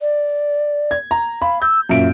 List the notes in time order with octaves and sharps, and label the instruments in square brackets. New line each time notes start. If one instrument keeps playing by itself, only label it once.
[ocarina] D5
[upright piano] G#6
A#5
[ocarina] F5 [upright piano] B5
[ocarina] E6 [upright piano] G6
[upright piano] F#2 A#2 D7 [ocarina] E5